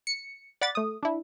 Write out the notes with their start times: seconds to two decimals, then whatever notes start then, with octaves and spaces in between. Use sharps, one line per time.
0.07 C#7
0.61 D5 F#5 B5 A6
0.75 A3 D#6
1.03 D4 E4